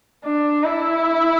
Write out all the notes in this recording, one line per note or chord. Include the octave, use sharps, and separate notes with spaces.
D4
E4